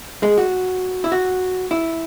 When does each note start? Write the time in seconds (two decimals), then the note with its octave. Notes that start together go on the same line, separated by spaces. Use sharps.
0.23 G#3
0.38 F#4
1.04 E4
1.12 F#4
1.71 E4